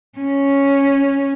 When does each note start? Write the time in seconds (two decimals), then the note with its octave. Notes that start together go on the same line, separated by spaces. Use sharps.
0.19 C#4